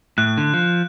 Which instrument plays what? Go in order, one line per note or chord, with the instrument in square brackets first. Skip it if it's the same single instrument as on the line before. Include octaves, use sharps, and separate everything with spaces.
[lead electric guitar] A2 [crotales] F#6
[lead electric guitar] D3
F3